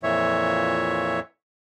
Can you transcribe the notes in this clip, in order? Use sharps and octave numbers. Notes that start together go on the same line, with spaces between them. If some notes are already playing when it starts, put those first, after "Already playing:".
F2 A#2 E3 C#5 E5